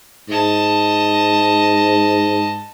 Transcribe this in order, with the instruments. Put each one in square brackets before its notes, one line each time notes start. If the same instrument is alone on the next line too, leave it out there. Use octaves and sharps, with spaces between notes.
[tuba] G#2 [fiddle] D#5 A5